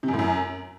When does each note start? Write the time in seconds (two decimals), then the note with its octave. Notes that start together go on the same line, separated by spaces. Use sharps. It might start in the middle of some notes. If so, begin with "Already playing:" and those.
0.03 C3
0.08 F#2
0.14 A2
0.19 F#2